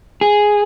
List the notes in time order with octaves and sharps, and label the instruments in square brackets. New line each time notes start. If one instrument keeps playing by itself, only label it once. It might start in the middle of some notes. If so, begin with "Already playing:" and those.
[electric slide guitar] G#4